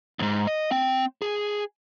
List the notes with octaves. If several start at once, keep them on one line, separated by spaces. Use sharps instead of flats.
D#2 G#2
D#5
C4 G5
G#4